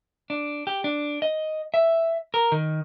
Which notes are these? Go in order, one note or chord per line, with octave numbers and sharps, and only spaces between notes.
D4
G4
D4
D#5
E5
A#4
D#3